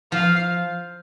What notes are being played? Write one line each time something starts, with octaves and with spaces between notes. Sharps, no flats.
F3 F5